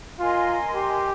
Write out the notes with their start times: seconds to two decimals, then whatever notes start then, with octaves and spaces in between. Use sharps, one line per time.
0.19 F4 A#4 D#5 G#5 C6
0.75 G4